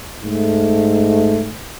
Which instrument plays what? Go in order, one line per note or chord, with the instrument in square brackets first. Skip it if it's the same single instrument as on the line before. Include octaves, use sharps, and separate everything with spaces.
[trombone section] G#2 A3